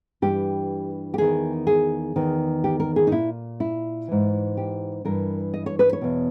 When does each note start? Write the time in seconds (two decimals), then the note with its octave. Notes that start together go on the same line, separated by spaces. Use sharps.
0.22 G2 E3 G4
1.14 G4
1.18 E2 D#3 G#4
1.67 G#4
2.16 E2 D#3
2.64 G4
2.80 A#4
2.96 G#4
3.07 D#4
3.12 A#2 E4
3.60 E4
4.08 G#2 E3
4.57 G4
5.05 G2 E3 A#4
5.54 D#5
5.66 C#5
5.79 B4
5.93 C#5
6.01 E2 B2